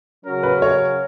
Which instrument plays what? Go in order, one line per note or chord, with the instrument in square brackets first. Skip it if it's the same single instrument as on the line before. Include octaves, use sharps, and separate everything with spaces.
[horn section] C#3 F#3 C#4 F#4 A#4
[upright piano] B4
C#5